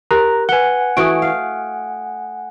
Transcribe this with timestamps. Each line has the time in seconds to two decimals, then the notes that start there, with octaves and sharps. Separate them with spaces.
0.11 G4 A#4 A#5 F#6
0.49 B4 F#5 G#5 G7
0.97 E3 A3 F#4 D#6 D7
1.22 F5